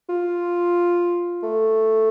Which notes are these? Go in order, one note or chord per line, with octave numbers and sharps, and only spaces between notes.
F4
A3